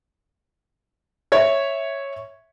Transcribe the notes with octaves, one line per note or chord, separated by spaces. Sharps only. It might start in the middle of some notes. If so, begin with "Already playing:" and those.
C#5 E5